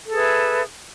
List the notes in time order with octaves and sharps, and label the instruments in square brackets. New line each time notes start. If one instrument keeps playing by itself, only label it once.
[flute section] A4
G#4
B4
E5